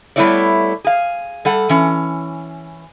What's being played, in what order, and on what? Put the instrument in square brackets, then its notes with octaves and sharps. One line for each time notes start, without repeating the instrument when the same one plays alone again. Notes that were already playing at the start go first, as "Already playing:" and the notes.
[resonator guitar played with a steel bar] G3 A3 B3 E4 C#5 D5
G#4 F5
G3 A4 F#5
E3 C#4